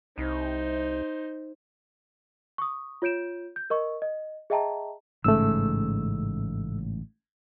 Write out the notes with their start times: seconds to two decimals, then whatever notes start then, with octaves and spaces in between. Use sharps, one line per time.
0.18 C2 D#4 C5
2.58 C#6 D#6
3.02 F4 C#5 G6 D7 E7
3.56 G6
3.70 A#4 D#5 C#6
4.02 D#5
4.50 G#4 D#5 E5 G5 A5 A#5
5.24 A1 G#2 C#3 A3 E6